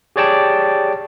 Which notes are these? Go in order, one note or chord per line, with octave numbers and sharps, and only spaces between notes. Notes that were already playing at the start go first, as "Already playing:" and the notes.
G4 G#4 C#5 D5 G5 A5